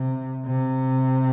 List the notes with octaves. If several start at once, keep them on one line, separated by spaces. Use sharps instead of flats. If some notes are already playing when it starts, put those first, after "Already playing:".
Already playing: C3
C3